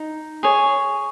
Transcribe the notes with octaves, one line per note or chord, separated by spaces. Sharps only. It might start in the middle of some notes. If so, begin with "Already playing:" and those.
Already playing: D#4
G#4 C#5